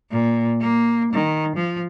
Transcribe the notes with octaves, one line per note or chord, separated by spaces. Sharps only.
A#2
A#3
D#3
F3